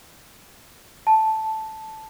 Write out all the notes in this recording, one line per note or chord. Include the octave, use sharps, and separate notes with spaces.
A5